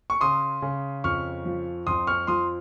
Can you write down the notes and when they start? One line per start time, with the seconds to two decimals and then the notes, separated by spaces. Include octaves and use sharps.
0.10 C#6
0.21 C#3 C6 D#6
0.62 C#3
1.04 F2 C#6 F6
1.45 F3
1.87 F2 C6 D#6
2.07 C#6 F6
2.27 F3 C6 D#6